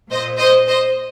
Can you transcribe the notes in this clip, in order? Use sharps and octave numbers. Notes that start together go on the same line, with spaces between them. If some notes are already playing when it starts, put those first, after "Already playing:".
A#2 C5 D#5
C5 D#5
C5 D#5